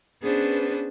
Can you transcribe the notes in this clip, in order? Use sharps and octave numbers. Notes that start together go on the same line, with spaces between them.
B3 C#4 D4 G#4 B4 C5